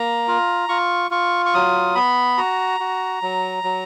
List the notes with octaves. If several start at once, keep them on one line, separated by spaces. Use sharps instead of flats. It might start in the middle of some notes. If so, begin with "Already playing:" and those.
Already playing: A#3 A#5
F4
F4 C#6
F4 C#6
C#6
F#3 D#6
B3 B5
F#4 A#5
F#4
F#3
F#3